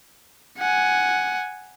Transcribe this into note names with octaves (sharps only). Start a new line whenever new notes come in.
F#5 G#5